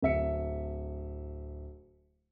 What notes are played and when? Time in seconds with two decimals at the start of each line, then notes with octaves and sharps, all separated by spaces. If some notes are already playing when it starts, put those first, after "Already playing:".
0.02 D1 E5 C#7